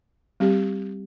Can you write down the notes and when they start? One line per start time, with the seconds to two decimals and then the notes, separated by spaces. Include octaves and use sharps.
0.40 G3 C4 G4